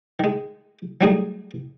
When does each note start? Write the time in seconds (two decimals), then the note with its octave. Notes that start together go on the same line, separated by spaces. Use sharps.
0.19 D#3 G#3
1.01 F#3 G3 A3 D#4 G#4 D#5